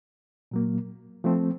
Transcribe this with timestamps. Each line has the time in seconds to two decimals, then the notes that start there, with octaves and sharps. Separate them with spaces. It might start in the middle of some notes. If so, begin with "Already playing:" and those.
0.51 A#2 F#3 A#3
1.24 F3 A3 C4